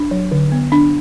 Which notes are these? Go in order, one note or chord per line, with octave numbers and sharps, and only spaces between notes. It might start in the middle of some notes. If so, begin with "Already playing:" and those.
Already playing: D4
F#3
D3
B3
D4